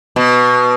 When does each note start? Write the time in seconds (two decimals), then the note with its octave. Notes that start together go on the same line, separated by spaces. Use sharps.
0.16 B2